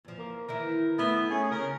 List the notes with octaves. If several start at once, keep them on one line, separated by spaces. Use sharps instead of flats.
E2 F3
A#3
D#3 E3 E4 A#4
D#3 A3 B3 E4
C#4 G#4
C#3 A#4